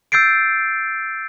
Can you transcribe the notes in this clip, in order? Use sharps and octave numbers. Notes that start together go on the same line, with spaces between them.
E6 G6 A6 C7 D7